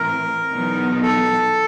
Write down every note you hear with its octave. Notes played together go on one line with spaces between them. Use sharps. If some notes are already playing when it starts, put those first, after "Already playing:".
Already playing: A2 E3 A3 C4 E4 A#4
E2 B2 F#3 B3 D#4
A4